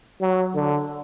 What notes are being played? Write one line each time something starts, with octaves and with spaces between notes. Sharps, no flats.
F#3
D3